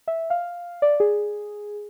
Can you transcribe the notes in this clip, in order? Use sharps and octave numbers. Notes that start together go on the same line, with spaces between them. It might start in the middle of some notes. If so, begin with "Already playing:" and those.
E5
F5
D5
G#4